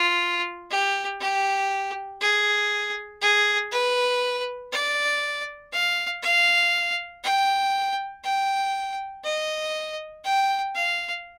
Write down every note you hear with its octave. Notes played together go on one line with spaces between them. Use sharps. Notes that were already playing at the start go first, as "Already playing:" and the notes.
Already playing: F4
G4
G4
G#4
G#4
B4
D5
F5
F5
G5
G5
D#5
G5
F5